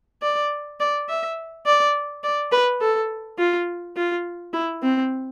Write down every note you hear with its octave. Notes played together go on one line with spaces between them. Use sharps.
D5
D5
E5
D5
D5
B4
A4
F4
F4
E4
C4